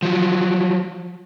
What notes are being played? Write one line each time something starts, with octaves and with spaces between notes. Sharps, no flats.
F3 F#3